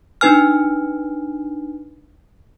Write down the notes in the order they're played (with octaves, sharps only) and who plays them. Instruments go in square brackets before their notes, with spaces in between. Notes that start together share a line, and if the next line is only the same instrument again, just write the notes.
[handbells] D4 D#4 B4 G#5 F6